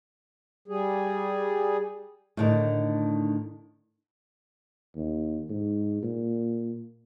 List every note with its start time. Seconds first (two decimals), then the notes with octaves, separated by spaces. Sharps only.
0.68 G3 G#4
2.37 A2 D3 D#3
4.96 D#2
5.50 G#2
6.03 A#2